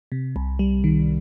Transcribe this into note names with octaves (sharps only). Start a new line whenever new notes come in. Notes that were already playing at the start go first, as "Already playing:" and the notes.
C3
C2
G3
D#3